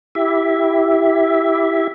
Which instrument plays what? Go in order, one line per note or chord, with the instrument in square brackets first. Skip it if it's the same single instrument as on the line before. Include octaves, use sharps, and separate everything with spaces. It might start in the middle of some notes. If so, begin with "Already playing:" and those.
[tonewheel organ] E4 G4 E5